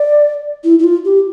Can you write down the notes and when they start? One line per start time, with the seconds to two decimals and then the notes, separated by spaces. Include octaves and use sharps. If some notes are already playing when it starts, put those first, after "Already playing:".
Already playing: D5
0.64 E4
0.79 E4
0.84 F4
1.05 G4